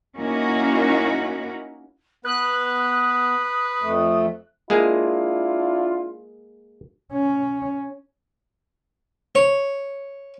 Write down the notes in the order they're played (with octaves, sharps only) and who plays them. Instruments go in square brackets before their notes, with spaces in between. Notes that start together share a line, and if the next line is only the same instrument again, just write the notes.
[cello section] A#3 C#4 D#4 E4 F#4
[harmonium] B3 [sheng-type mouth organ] B4 [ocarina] D#6 [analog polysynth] F#6
[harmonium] F2 A3
[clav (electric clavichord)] G#3 A#3 G#4 [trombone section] D4 E4 F4
[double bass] C#4
[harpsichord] C#5